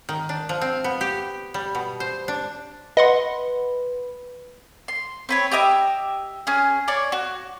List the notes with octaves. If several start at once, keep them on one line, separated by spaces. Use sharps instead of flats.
D#3
D4
F3
C4
B3
G4
G3
B2
C5
D4
B4 D#5 F#5 C6
C6
C4 B4 C#5
G4 D#5 E5 D6
C#4 G#4
C#5 D5 D6
F#4